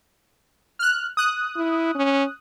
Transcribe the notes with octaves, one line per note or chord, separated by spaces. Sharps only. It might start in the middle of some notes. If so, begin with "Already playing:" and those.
F6 F#6
D#6 F#6
E4
C#4